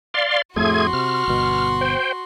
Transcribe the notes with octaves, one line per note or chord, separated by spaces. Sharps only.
D5 F5 C6
F2 A2 A3 F#4 G#4 C6 G#6
C3 F6
G1 B2
C5 G5